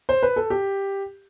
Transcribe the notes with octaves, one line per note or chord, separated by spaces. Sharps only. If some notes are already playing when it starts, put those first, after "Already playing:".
C5
B4
A4
G4